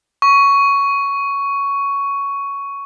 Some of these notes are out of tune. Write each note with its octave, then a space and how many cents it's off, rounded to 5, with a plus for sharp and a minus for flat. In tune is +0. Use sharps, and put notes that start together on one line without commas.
C#6 +10